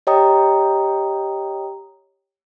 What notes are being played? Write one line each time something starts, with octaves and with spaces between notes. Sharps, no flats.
G4 C#5 D#5 G5 A#5 D#6